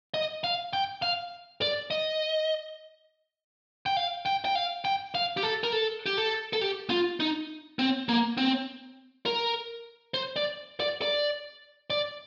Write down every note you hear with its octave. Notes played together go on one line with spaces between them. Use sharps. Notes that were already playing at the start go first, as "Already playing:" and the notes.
D#5
F5
G5
F5
D5
D#5
G5
F5
G5
G5
F5
G5
F5
G4
A4
A#4
A4
G4
A4
A4
G4
F4
D#4
C4
A#3
C4
A#4
C5
D5
D5
D5
D5